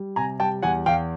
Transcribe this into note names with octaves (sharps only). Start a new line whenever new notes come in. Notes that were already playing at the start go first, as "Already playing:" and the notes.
Already playing: G3
C3 G#5 A#5
G3 G5 A5
E2 F#5 G#5
E2 F5 G5